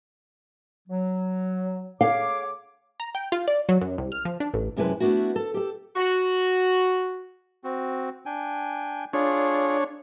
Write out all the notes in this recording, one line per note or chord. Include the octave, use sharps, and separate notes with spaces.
F#3
G#4 C#5 F5 D6
A#5
G5
F4
D5
F#3
F#2
C2
F6
F3
D4
A1
F#2 C3 G#3 E4 B4 A5
A3 B3 D4 E4 F#4
A4
G4 A4
F#4
C4 F#4
D4 G5 G#5
D4 F4 G#4 C#5